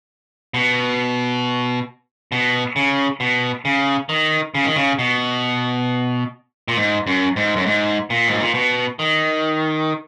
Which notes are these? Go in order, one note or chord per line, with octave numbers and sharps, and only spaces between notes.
B2
B2
C#3
B2
C#3
D#3
C#3
D#3
C#3
B2
A#2
G#2
F#2
G#2
F#2
G#2
A#2
G#2
A#2
B2
D#3